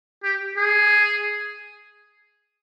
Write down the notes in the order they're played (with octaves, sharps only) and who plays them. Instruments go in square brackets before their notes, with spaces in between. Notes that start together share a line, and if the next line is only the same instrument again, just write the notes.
[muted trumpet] G4
G#4